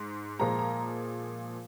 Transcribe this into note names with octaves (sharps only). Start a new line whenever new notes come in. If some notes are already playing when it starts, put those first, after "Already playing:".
Already playing: G#2
A#2 F3 G#3 A#5
A#5